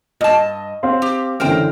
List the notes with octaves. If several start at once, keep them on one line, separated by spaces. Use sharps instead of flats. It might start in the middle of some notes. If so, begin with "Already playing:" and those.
G2 D#5 A5
C4 F5 C6
G4
F#2 D3 E3 A#4 C5 G5